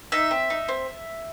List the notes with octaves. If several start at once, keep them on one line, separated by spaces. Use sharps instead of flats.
D#4 E5
C4
D#4
C4